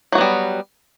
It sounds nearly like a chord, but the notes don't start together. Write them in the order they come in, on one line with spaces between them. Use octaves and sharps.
F#3 F#4 B3 G3